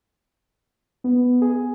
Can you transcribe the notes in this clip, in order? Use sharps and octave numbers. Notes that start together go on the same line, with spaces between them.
B3
G#4